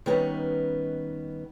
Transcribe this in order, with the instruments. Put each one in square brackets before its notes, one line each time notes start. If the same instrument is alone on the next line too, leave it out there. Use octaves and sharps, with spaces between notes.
[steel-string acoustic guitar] D#3 G3 B3 C#4 D#4 B4